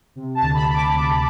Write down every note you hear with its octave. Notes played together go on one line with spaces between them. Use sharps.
C3
A5
D2
B5
D2
D6
D2